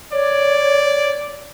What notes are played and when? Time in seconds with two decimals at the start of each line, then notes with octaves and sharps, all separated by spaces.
0.13 C#5 D5